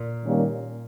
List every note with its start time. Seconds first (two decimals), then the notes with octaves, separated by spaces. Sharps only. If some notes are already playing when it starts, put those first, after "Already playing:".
Already playing: A#2
0.24 D#3 G3 A#3 C#4